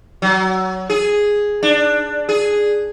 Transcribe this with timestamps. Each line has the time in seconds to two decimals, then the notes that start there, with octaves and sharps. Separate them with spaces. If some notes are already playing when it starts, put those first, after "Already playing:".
0.22 F#3
0.90 G#4
1.63 D4
2.29 G#4